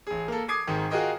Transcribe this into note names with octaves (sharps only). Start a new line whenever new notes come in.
A1 G#4
A#3 A4
D6 D#6 G#6 C7
G#1 G#2 D#3
F4 F#4 G#4 A#4 D#5 G5